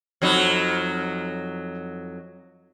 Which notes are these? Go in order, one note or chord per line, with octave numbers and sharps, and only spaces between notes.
F2 F#3 D#4